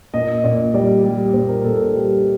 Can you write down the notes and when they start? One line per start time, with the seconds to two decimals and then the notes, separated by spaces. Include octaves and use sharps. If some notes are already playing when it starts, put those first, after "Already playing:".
0.14 A#2 D#5
0.44 A#2 D5
0.74 G3 D5
1.04 G3
1.29 D5
1.34 A#2 C5
1.48 A#4
1.64 A#2 A4
1.79 A4
1.94 G3 G4